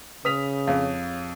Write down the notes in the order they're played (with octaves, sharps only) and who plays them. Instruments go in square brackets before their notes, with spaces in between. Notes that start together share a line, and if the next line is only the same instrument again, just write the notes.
[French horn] C#3 [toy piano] B4 [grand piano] D#6 B6 F7
[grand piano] F2 [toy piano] G#4 C#5 F5